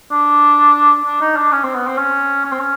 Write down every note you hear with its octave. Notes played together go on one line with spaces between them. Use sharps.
D4
D4
D#4
D4
C#4
C4
B3
C4
C#4
C#4
C4
C#4